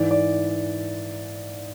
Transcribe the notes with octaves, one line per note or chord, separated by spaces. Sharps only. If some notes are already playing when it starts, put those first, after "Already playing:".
Already playing: G#2 E3 D5
D5